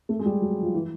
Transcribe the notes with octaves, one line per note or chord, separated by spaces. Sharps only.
A3
G#3
G3
F#3
F3
E3